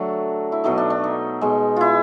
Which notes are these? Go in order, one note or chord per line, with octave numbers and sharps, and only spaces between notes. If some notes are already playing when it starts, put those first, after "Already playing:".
Already playing: D3 F#3 A3 A4
E4
B2 F#3 A3 D#4
D4
D4
D#4
B2 G#3
E4 F4